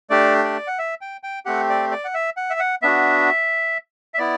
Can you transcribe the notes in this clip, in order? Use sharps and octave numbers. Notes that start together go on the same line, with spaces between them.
A3 D4 G4 D5
D5
F#5
E5
G5
G5
A3 C4 G4 F#5
D5
D5
F#5
E5
F#5
E5
F#5
B3 D4 F#4 E5
E5
B3 E4 D5